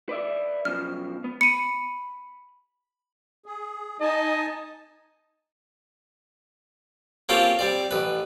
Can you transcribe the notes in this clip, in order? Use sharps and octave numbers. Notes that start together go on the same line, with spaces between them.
B4 D5 E5
F#2 B2 F3 F6
B3
B5 C#7 D#7
G#4
D#4 D#5 G#5 A5
A#3 C4 C#4 F4 G4 A4
G3 C4 D5
A1 B4